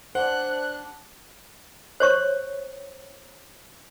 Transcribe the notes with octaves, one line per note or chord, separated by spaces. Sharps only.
D4 C5 F#5 F#6
C5 C#5 C#6